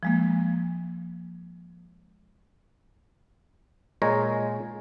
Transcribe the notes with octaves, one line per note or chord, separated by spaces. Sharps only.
F3 G#3 A#3
A#2 G#3 C#5 A#5